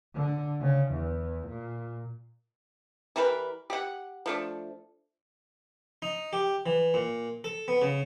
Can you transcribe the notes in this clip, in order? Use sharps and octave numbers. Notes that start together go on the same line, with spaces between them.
D3
C#3
E2
A#2
E3 G3 A#4 B4
G4 F#5
F3 A3 D4
D#4
G4
E3
A#2
A4
B3
C#3